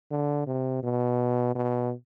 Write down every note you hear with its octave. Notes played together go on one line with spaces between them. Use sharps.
D3
C3
B2
B2